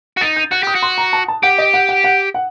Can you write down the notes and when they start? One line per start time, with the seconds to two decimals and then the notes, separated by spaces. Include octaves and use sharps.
0.17 F#4
0.21 D#4 A6
0.36 G6
0.51 F#4 F#6
0.63 G4 D#6
0.75 F#4
0.82 C6
0.98 A#5
1.13 A5
1.28 A5
1.43 G4 F#5
1.58 D#5
1.74 F#5
1.89 F#5
2.04 F#5
2.34 F#5